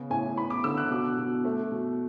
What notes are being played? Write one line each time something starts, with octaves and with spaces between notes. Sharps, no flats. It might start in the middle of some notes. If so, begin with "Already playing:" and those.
Already playing: C#3 B3
A2 G#5
B3 B5
D6
D3 E6
F#6
B2 D6
B2
A3
B2